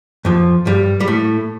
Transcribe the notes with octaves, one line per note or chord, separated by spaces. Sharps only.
F2 F3
G2 G3
G3
A2 A3